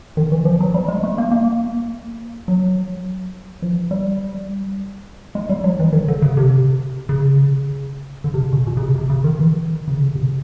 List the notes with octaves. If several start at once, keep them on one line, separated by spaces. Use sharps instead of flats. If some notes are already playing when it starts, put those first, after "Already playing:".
D#3
E3
F3
F#3
G3
G#3
A3
A#3
A#3
F#3
F3
G3
G#3
G3
F#3
E3
D#3
D3
C#3
C3
C#3
D3
C3
C#3
B2
B2
C#3
C3
C3
C#3
D#3
E3
C#3
D3
C3